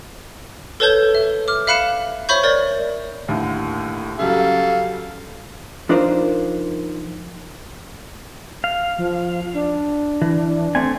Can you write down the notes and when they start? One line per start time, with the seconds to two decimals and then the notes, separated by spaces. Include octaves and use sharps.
0.80 A4 B4 C#5 A5 G6 G7
1.15 E5
1.48 D6 F6
1.67 E5 F5 B5 F#6 C#7 E7
2.29 C5 C#5 E5 B5 C#6 G6
2.43 A#4 C#5 D5 A6
3.28 D#2 A2 D3
4.19 C#3 F#3 G3 A4 F5
5.89 F3 D4 D#4 F4 A#4 C5
8.64 F5
8.98 F3
9.54 D4
10.22 E3
10.75 A3 C4 G#5